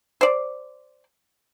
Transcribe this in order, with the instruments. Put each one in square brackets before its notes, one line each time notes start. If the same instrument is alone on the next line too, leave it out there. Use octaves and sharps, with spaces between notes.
[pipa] C5 D5